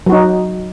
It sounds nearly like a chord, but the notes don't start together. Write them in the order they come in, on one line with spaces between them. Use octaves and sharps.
F#3 F#4 D#4